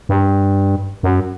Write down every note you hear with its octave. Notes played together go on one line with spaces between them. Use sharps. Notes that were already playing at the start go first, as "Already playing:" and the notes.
G2
F#2